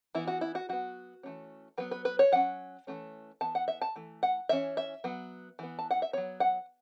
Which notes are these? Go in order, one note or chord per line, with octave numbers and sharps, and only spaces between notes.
E3 B3 E4
F#4
E4
F#4
F#3 B3 F#4
E3 A3 C#4
F#3 B3 B4
B4
B4
C#5
F#3 C#4 F#5
E3 A3 C#4
E3 B3 A5
F#5
E5
A5
E3 A3
F#5
E3 C#4 E5
E5
F#3 B3
E3 B3
A5
F#5
E5
F#3 B3 C#5
F#5